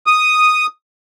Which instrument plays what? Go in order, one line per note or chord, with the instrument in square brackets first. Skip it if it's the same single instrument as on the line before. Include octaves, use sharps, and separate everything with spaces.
[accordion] D#6